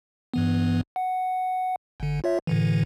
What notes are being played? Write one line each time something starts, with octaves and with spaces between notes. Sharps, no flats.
G2 E3 B3
F#5
G1 D3
F4 C#5 E5
A2 D3 E3